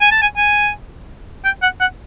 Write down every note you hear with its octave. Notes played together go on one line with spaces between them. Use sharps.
G#5
A5
G#5
G#5
G5
F#5
F#5